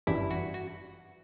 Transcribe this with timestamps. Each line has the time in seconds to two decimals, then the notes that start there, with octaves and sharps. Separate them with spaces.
0.07 G1 F#2 E3 G3 D4 E4
0.31 F#4
0.54 F#4